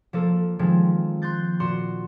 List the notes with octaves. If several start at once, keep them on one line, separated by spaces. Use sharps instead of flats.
F3 A#3 A4
D#3 F3 G#3 C4
C6 F#6 G6 A6
A#2 F#4 C6 E7